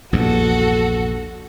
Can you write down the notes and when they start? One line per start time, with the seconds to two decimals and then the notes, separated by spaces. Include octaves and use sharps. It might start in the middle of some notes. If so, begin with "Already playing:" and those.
0.13 A#1 E2 G2 F#4 A4